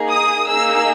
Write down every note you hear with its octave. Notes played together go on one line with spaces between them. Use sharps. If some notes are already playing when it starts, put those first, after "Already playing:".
Already playing: A#3 D#4 G#4
D#6
A#3 D#4 G#4 E6